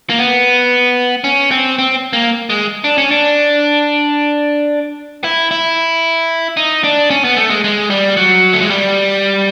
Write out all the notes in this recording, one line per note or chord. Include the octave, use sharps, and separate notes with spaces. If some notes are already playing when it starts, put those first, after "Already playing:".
A#3
B3
C#4
C4
C4
A#3
G#3
D4
C#4
D4
E4
E4
D#4
D4
C#4
B3
A3
G#3
G#3
G3
F#3
A3
G#3
G3